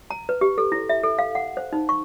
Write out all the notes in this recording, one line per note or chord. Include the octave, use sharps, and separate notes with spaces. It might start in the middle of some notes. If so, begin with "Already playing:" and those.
A#5
B4
G4
A4
E4
E5
A4
F5
F#5
C5
D#4
C#6